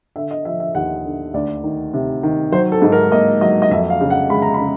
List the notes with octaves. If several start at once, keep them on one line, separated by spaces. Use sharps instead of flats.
D3 E5
D#5
F3 E5
E5
D#2 F#5
D3
D2 D5
D#3
C3
D#3
F#3 C5
A4
G#2
A#4
A#3 D#5
F#3 D#5
D#5
F2 E5
F5
C#3
F#5
G#3 B5
A#5
B5
C#3